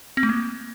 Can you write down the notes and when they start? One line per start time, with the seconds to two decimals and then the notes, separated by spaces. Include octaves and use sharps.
0.17 C4
0.23 A3
0.29 A#3